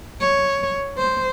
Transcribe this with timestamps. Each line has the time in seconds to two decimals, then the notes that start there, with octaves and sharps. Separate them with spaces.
0.21 C#5
0.98 C5